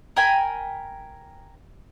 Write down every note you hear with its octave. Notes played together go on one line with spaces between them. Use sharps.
A#4 G5 G#5 B5